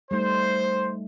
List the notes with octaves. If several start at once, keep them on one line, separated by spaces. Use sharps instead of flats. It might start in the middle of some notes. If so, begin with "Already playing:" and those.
G3 A3 D#4 C5